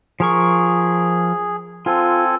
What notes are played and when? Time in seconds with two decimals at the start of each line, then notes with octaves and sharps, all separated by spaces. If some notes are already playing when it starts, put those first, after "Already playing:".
0.20 F3 G#4 A#4 C#6
1.86 C4 F4 A4 G#5